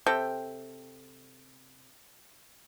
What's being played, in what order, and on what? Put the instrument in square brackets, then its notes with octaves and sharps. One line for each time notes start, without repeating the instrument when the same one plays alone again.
[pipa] C3 C4 A4 G5